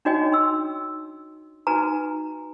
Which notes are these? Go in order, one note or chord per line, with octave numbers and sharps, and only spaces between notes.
D4 D#4 F#4 C#5 D#5 G5
C6 E6
D#4 F#4 B4 G#5 A#5